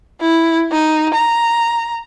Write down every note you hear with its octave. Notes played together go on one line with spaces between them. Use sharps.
E4
D#4
A#5